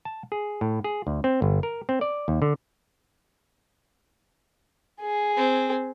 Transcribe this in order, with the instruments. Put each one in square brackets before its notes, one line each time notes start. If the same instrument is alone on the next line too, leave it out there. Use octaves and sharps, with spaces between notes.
[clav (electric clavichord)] A5
G#4
A2
G#4
D2
C4
G1
A#4
C4
D5
D#2
D3
[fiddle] G#4
[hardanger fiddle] C4